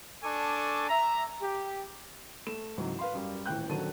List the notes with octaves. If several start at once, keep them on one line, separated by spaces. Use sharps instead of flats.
D4 A4 G#5 A5 C#6 D6
E5 A#5
G4
A3 E7
C#2 G#2 E3 F#3
B4 F5 C6
F#2 G3
D#1 A2 E3 G5 F#6 G6
D#1 D3 D#3 F#3 A5 D#7